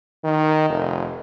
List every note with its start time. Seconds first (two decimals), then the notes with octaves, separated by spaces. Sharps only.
0.24 D#3
0.70 F1